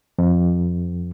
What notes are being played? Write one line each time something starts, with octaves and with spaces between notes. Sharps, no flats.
F2